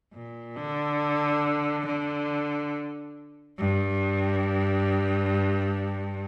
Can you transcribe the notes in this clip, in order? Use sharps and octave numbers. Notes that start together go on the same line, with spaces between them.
A#2
D3
D3
G2